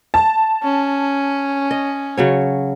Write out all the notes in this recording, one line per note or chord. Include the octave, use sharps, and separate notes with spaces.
A5
C#4
D#5
C#3 F#3 C#5